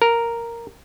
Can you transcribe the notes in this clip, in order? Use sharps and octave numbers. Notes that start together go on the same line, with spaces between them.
A#4